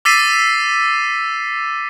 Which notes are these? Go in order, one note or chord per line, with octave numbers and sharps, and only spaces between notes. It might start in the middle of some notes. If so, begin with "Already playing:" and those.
D6 E6 A6 B6 C7 D#7